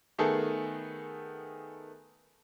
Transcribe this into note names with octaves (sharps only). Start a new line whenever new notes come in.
D#3 A3 B3 G#4 A4